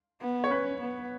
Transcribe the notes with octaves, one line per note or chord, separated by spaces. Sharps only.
B3
C#5
C#4 B4
B3